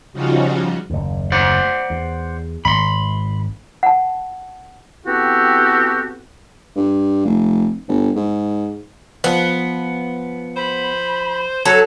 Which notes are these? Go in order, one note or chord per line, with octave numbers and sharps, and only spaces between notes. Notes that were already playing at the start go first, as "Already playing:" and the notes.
C#3 F3 G3 D#4 F4 F#4
F#1 D#2
C5 D5 F#5
E2
G#1 B5 C6
F#5 A5
B3 C4 E4 F#4 G4 A4
G2
F1
G1
G#2
F3 B3
C5 B5
F#3 A4 G#6